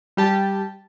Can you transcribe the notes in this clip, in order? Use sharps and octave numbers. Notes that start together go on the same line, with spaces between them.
G3 G4 A5